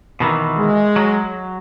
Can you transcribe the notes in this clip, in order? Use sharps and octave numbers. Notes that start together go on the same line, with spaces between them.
B2 D#3 E3
G#3
F#3